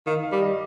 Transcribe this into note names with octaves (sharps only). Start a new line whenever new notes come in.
D#3 F5
F5
G3
D#5